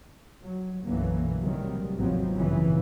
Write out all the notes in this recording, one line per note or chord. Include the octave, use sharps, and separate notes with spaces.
F#3
B1 F#2 D3 E3 F#3 A#3
A2 C3 D#3 F#3 G3
G#1 D#2 F3 F#3 B3 C4
G#1 F#2 A#2 C#3 E3